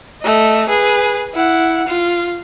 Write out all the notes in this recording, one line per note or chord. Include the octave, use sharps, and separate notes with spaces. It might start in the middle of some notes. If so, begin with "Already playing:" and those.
A3 D#5
G#4 B4
E4 F#5
F4